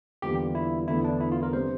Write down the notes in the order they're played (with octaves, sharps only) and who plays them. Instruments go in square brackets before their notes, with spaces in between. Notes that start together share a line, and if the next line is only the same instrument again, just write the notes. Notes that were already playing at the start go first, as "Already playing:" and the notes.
[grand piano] E2 D3 G3 A#3 F4 [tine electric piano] G4
[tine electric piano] E4
[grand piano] E2 D3 A3 [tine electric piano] E4
[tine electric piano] D4
E4
F4
A#4
[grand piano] C3 G3 D4 G4 [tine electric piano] C5